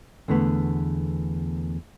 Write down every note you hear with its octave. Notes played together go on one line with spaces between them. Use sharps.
E2 D3 A3 B3